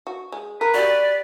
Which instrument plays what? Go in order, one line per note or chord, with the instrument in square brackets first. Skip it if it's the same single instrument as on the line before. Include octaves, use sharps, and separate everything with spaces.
[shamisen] F#4
G#3
[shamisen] A#4 [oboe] B4
[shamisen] F#4 G4 [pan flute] D5